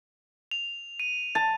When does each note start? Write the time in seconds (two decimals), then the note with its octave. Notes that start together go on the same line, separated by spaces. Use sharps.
0.51 F7
1.00 D#7
1.35 A5